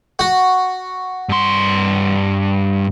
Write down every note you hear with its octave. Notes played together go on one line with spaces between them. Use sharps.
F#4
G2 C6